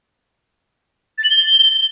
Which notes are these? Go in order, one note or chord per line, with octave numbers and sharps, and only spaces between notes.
A6
F#7
G7